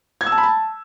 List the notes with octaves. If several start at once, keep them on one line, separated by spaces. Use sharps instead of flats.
G#6
E6
A5
B5
A5